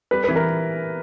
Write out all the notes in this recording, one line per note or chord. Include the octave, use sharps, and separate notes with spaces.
G3 B4
B4
E3
A#4